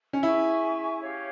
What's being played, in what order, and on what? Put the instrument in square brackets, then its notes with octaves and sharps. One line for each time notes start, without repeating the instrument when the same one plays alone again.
[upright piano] C#4
[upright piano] E4 [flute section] G#4 E5 G#5 C#6
[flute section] C#4 G4 C#5 F5